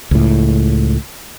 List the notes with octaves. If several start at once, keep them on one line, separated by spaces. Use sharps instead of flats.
C#2 A2